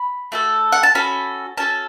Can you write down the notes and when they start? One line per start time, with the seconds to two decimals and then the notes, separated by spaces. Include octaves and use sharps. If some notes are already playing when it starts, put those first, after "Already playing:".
Already playing: B5
0.32 A3 F#4 A4
0.72 F#5
0.83 A5
0.95 C#4 F#4 A4 B5
1.57 C#4 F#4 A4 A5